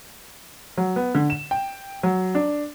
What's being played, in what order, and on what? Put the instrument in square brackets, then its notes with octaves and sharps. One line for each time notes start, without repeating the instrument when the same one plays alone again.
[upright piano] F#3
B3
D3
E7
G5
F#3
D4